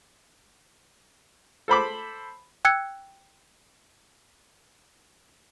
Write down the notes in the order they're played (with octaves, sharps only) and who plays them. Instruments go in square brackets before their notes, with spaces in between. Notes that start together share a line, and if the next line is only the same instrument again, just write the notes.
[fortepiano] A4 C5 B5 D6
[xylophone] G5 E6 F#6 G#6 C#7